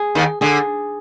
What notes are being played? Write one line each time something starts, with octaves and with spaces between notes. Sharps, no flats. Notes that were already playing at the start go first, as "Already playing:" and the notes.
Already playing: G#4
D#2 D#3
D3 G#4